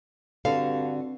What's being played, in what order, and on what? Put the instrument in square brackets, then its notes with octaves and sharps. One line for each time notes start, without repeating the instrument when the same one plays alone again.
[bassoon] G2 [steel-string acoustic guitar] D3 F#4 [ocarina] C4 [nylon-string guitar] F5